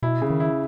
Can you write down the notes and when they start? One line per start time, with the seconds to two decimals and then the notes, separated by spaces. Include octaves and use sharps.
0.02 B2 E4
0.22 C#3
0.30 D#3
0.40 E4